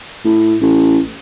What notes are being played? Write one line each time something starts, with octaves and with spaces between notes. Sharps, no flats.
A2
A1